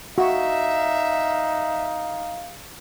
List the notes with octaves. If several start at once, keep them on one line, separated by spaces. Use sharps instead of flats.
D#4 F#4 E5 F5